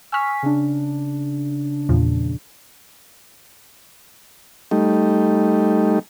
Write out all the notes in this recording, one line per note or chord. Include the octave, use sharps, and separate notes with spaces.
G#5 C#6 E6 F6 B6
C#3 D4
E2 A#2 F3
G3 A3 D#4